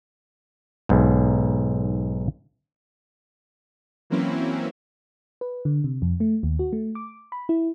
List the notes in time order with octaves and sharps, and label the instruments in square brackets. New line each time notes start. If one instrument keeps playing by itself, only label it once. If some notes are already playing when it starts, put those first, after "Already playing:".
[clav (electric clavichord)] B1 G#2
[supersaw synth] E3 F#3 A#3 C4 C#4 E4
[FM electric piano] B4
D3
C3
F2
A3
D#2
F#4
A3
D6
B5
E4